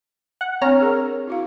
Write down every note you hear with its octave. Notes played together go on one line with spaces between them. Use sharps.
F#5
C4 D4 C#5 A#5 F6
G#4 A#4
E4 F#4 F5